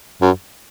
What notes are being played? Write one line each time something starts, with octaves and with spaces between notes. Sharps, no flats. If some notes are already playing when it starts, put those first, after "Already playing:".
F#2